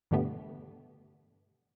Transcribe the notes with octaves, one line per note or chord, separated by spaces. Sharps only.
G2 B2 D3 G3 A3 B3